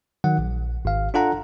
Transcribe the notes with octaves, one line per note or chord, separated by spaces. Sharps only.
D#3 F#3 F#5
A#1
G#1 F5
D4 F4 A4 F#5 A#5